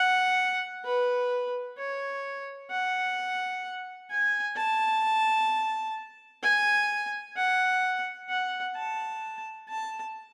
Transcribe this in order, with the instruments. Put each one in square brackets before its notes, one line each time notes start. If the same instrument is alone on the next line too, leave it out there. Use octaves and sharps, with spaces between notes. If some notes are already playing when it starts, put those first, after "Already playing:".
Already playing: [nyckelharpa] F#5
B4
C#5
F#5
G#5
A5
G#5
F#5
F#5
A5
A5